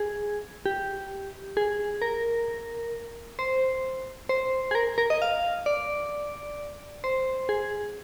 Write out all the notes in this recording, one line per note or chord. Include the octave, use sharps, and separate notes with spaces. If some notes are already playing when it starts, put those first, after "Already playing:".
Already playing: G#4
G4
G#4
A#4
C5
C5
G#4
A#4
A#4
D#5
F5
D5
C5
G#4